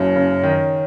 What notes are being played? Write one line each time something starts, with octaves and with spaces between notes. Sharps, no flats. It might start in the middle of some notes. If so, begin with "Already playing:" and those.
Already playing: F#1 F#2 C#5
C#3
D#3